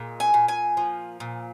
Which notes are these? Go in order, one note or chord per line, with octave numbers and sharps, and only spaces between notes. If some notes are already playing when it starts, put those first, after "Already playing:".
Already playing: A#2 G#3
G#5
A#2
G#5
F3
A#2